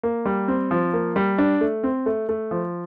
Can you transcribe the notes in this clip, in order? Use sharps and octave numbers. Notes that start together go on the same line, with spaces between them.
A#3
G3
C4
F3
A#3
G3
D4
A3
C4
A3
A3
F3